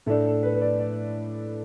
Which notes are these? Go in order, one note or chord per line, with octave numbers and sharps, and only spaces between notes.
A2 A3 D4 A4
A4
B4
B4
D5
D5